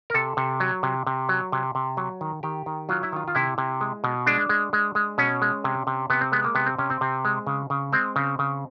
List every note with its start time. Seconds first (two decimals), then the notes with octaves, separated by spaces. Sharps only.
0.10 A#4
0.14 C3 A4
0.37 C3
0.60 F#3
0.83 C3
1.07 C3
1.29 F#3
1.52 C3
1.75 C3
1.97 F#3
2.21 D#3
2.43 D#3 G4
2.66 D#3
2.89 F#3 F4
3.03 E4
3.13 D#3 F4
3.28 F4
3.35 C3 E4
3.58 C3
3.81 G#3
4.04 B2
4.26 G#3 D4
4.49 G#3
4.73 G#3
4.95 G#3
5.18 B2 C#4
5.42 G#3
5.64 C3
5.87 C3
6.10 C3 B3
6.21 C4
6.32 G#3 B3
6.45 A#3
6.55 C3 B3
6.66 C4
6.78 C3 C#4
6.90 C4
7.01 C3
7.25 G#3
7.47 C#3
7.70 C#3
7.93 G#3 C4
8.16 C#3
8.39 C#3